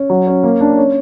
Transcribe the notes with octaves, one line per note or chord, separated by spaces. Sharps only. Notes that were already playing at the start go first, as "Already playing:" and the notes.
Already playing: C#4
F#3
C#4
A#3
D4
C#4